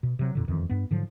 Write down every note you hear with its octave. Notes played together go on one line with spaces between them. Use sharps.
B2
C3 F#3
F2 A#2 D3
E1 F2 D#3 E3
G2 B3
G#2 D3 F3 F#3